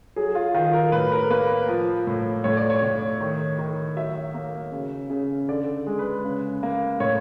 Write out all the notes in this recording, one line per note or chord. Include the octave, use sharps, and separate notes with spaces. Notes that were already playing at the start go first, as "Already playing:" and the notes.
F#3 G#4
F4
D#3 F4
A#4
A2 B4
A#4
A#3 B4
F3
A2
A2 C#5
D5
C#5
A2
D#3
D#3
F#3 E5
A#3
C#3
C#3
D3 D5
G#3
B4
C#3
A#3
A2 C#5